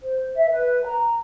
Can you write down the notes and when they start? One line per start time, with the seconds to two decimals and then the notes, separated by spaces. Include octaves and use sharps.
0.03 C5
0.36 E5
0.50 B4
0.85 A#5